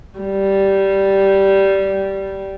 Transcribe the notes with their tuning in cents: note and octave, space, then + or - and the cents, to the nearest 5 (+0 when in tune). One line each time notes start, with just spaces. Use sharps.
G3 -10